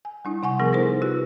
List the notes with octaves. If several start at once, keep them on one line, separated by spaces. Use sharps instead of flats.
G#5
G3 D4 E4
C3 F#5 G#5 C#6
C3 F3 B3 G#4 A#4
B3 D#4 E4 A4 A#4 C5
F4 G4 B4